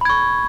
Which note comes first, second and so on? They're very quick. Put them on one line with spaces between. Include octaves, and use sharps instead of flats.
B5 G#6 C#6